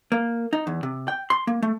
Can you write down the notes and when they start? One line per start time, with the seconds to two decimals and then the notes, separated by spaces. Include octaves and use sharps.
0.12 A#3
0.53 D#4
0.67 E2
0.83 C3
1.08 G5
1.30 C6
1.47 A#3
1.62 A3